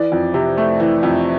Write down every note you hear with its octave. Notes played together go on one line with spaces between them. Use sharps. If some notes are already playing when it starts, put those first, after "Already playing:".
Already playing: E3 D5
F2
C3
A3
E3
F2